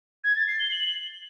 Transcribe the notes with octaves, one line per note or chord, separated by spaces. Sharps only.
G#6
A6
C7
G7
F#7